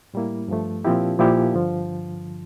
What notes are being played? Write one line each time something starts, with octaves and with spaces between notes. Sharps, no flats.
A2 G3 A#3 E4
G2 F3 A3
A#2 F3 C4 E4 G4
A#2 F3 A#3 E4 G4
G2 D3 F3